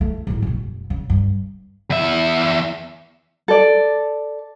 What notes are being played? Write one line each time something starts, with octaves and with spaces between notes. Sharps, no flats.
A3
G#1 A2
B2 F3
F#1
C#3
G2
E2 E5
A4 D5